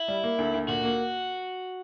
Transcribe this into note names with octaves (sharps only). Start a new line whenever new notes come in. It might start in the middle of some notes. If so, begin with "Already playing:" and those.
Already playing: E4
G3
A#3
D2
D2
A#2 F#4
A#3